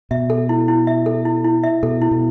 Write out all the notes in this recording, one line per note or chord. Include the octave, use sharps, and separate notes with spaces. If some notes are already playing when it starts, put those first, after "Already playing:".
B2 E5
A4
E4
E4
E5
A4
E4
E4
E5
B2 A4
E4
B2